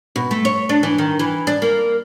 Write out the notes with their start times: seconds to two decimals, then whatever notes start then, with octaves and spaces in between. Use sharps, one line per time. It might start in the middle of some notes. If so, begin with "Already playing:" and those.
0.16 B2
0.31 A3
0.45 C#5
0.69 D4
0.83 E3
0.98 D#3
1.19 E3
1.47 D4
1.62 A#3